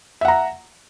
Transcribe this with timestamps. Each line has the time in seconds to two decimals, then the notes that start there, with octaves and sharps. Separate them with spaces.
0.21 E5
0.25 F#5
0.28 A#5